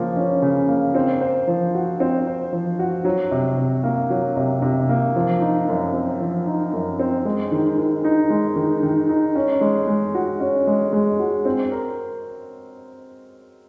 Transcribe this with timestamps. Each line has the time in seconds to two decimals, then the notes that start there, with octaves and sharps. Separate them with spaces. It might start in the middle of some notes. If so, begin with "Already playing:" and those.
Already playing: C#3 F3 A#3
0.17 C#4
0.42 C#3
0.68 A#3
0.95 C4
1.21 C5
1.48 F3
1.74 F#4
2.00 C4
2.27 C5
2.53 F3
2.79 F#4
3.05 F#3
3.31 C3
3.58 C3
3.84 A#3
4.10 F#3
4.37 C3
4.62 C3
4.89 A#3
5.16 F3
5.41 D#4
5.68 F#2
5.94 C4
6.20 F3
6.47 D#4
6.73 F#2
6.99 C4
7.25 G#3
7.52 D#3
7.78 D#3
8.04 D#4
8.30 G#3
8.56 D#3
8.83 D#3
9.09 D#4
9.35 C#4
9.61 G#3
9.87 G#3
10.15 F#4
10.40 C#4
10.67 G#3
10.93 G#3
11.19 F#4
11.45 C4
11.72 A#4